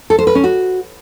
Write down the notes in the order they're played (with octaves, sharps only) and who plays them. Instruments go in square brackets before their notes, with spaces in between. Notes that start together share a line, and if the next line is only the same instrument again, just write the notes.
[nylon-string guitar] A4
C5
B4
C#4
F#4